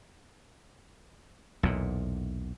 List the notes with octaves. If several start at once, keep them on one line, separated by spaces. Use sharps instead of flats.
B1 E2 A#2